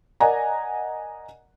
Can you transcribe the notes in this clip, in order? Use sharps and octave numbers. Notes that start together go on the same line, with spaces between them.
A#4 D5 D#5 F#5 G#5 A#5